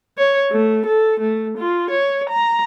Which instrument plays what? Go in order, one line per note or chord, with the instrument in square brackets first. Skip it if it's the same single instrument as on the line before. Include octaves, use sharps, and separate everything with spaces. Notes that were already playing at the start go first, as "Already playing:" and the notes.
[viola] C#5
A3
A4
A3
F4
C#5
A#5